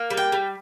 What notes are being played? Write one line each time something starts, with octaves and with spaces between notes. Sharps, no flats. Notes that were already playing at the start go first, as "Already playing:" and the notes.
Already playing: A#3
G3
G5
G3